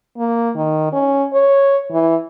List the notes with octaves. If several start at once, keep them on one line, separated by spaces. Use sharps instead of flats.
A#3
D#3
C#4
C#5
E3